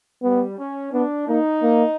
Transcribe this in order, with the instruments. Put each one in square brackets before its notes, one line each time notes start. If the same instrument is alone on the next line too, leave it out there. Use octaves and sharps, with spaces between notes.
[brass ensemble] G3 [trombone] B3
[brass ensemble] C#4
[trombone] B3 [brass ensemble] D4
[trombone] A#3 [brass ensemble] D#4
[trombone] A#3